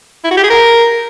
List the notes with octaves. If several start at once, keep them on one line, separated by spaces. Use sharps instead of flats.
E4
F#4
G4
G#4
A#4